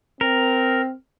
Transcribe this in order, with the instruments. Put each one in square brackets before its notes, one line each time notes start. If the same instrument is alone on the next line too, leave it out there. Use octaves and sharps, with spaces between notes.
[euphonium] C4 [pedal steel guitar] A#4